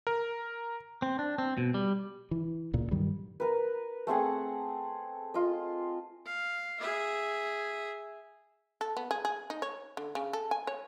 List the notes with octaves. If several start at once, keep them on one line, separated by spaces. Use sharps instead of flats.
A#4
C4
D4
C4
B2
G3
E3
C#2 A#2
G2 D#3 F#3 G3
A#4 B4
A3 C4 G#4 F#5
F4 D#5
F5
G#4 E5
A4
B3
G#4
G#4
D#4
C#5
D3
C#3
A4
G#5
C#5